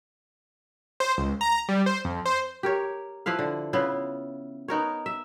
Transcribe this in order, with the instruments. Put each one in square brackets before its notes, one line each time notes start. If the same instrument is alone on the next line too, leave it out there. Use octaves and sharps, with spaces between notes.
[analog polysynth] C5
C#2
A#5
G3
C5
F2
C5
[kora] G4 A#4 C#5
F3 E4 B4 F5
D3
C#3 B3 E4 F4
B3 D#4 A#4 C#5
E5